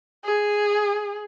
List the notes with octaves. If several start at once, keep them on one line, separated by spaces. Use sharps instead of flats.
G#4